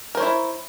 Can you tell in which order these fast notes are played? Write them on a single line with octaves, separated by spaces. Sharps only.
A#4 C5 C#5 E4